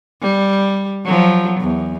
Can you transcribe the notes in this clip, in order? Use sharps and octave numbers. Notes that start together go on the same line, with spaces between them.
G3
F3 F#3
E2